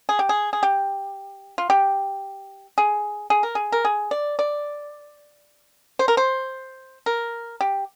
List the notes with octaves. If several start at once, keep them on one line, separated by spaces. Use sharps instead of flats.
G#4
G4
G#4
G#4
G4
F4
G4
G#4
G#4
A#4
G#4
A#4
G#4
D5
D5
C5
A#4
C5
A#4
G4